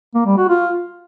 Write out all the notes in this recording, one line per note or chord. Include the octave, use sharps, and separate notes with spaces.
A#3
G3
F#4
F4